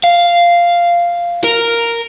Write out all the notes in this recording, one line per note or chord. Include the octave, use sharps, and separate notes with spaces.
F5
A#4